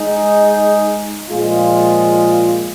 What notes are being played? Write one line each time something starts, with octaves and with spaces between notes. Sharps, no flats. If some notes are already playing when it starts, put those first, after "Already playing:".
Already playing: G#3 D#4 G#4
A#2 F3 G#3 F4